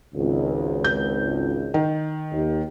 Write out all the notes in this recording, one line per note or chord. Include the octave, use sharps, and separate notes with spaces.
G#1 C#2
G6
D#3
D#2